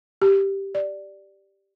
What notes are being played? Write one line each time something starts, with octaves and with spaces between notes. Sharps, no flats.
G4
D5